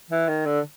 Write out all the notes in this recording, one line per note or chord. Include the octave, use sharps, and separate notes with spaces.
E3
D#3
D3